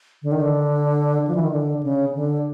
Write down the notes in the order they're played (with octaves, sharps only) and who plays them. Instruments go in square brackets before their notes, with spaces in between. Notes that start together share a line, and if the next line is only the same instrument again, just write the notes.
[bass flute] D3
D#3
D3
F3
E3
D#3
D3
C#3
D3